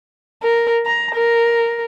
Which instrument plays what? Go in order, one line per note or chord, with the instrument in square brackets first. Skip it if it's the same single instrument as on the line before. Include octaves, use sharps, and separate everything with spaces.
[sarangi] A#4
A#5
A#4